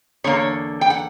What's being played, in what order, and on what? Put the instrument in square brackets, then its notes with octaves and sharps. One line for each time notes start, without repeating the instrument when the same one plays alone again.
[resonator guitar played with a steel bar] E2 D3 A#3 C#5
G5
F#5